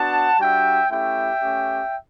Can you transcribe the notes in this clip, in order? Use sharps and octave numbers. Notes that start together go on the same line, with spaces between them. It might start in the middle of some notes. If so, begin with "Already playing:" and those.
Already playing: B3 D4 F#4 F#5 A5
G3 D4 F#4 E5 G5
A3 C#4 E4 G4 E5 G5
A3 C#4 G4